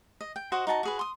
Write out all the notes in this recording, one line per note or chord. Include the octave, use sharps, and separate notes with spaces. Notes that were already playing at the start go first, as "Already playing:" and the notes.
D#5
G5
F#4 C5 D#5 F#5
D#4 F#4 A5 A#5
F#4 G#4 B4
C6 D#6